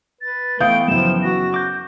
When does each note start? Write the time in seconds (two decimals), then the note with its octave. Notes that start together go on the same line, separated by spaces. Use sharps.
0.21 B4 A6
0.60 E3 A3 B3 F5 G5 D#6 G6 D7
0.88 F#2 C#3 F3 E4 E7
1.23 F#4 A#6
1.54 D6 G6